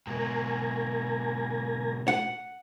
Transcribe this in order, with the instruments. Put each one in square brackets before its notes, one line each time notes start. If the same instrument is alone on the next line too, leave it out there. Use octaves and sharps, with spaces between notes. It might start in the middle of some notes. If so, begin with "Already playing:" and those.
[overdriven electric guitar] G#2 B2 [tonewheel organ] A#4 G#5 A#5
[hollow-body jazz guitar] F#5